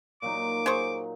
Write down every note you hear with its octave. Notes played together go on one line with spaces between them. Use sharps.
A#2 F#3 D#4 D6
G#4 C5 C#6